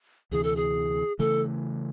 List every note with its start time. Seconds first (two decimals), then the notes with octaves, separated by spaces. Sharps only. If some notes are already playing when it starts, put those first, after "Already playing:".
0.31 D2 C3 E3 G#4
0.44 A4
0.56 G#4
1.19 C#3 E3 A3 A4